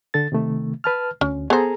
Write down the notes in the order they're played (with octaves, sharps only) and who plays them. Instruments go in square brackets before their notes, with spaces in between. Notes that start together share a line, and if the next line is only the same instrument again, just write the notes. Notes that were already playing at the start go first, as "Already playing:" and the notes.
[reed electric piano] D3 A4 A6
C3 D#3 A3
B4 A5 F6
[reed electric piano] D2 [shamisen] C#4
[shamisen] B3 C5 [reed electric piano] G#4 A4 A#5